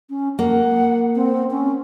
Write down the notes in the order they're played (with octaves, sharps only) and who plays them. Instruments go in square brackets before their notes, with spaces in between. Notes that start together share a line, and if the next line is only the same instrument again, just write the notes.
[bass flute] C#4
[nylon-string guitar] A#3 [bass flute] F#5
[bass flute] C4
C#4